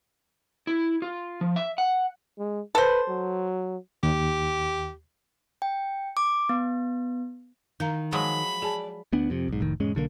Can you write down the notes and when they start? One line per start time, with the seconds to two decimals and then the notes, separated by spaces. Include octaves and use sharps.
0.67 E4
1.02 F4
1.41 F3
1.56 E5
1.78 F#5
2.38 G#3
2.75 A4 B4 C5
3.09 F#3
4.03 D#2 G4
5.62 G5
6.17 D6
6.49 B3
7.80 D#3 A#4 F5 A#5
8.12 F3 F#3 G#3 B5
8.62 G#4 D5 G#5 A5
9.13 D2 B3 D4
9.30 F2 C3
9.48 B1 G#2
9.60 F1 A2 D#3
9.80 E1 G#2 G#3 C#4
9.95 B1 D3 E3 A#3